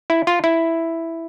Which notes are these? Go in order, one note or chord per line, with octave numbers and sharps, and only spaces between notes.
E4
F4
E4